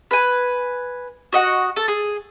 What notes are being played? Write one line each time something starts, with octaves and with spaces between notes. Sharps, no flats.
B4 G#5
F#4 D#5 F#5
A4
G#4